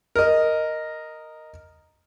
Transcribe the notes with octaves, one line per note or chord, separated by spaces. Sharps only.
A#4 D#5